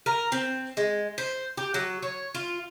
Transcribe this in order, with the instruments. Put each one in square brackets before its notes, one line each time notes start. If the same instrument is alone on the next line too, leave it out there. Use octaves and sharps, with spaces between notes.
[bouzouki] A#4
C4
G#3
C5
G4
F#3
C#5
F4